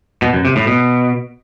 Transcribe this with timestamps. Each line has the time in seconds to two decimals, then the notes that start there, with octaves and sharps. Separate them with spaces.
0.22 B2
0.33 F#2
0.45 C3
0.56 A2
0.67 B2